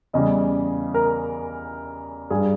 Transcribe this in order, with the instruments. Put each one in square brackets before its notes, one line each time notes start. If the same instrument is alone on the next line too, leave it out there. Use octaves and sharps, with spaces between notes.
[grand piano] E2 C#3 G3 D#5
A#4
G2 G3 G#4